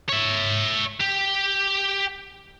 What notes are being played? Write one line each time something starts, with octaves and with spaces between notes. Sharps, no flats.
C#5 E5
G4